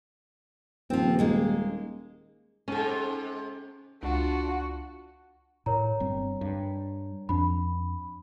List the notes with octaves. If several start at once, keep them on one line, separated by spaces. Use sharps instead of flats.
D#1 F3 C4
G#3 A#3 D#4
G#2 C3 C#4 A4
C#2 D4 F4 F#4
A2 A#4 C#5 A#5
G1 G3 C4
G2
F2 F3 D4 B5